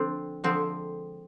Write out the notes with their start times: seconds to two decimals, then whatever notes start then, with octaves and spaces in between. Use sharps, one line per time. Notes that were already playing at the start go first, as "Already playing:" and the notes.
Already playing: D3 F3 C4 D4
0.44 D3 F3 G#3 C4